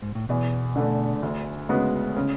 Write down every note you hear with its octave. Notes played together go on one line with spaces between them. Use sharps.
G#2
A2
E2 B2
D3 A3 D4
D2
C#3 G#3 B3 F#4
C#3